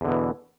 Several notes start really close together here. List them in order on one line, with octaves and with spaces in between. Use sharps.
E2 D3 B2 E3